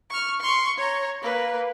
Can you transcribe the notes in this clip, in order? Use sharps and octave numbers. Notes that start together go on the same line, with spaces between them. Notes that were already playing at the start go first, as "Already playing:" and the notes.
C#6 F6
C6 C#6
C#5 A#5
A#3 B4